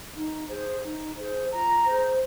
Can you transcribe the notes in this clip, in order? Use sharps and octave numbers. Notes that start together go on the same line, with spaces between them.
D#4
G#4 C5
D#4
G#4 C5
F4 A#5
G#4 C5